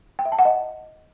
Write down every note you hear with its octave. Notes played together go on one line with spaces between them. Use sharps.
G5
E5
A5
F#5
D#5